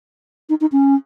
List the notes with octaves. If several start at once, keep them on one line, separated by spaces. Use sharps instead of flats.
D#4
D#4
C#4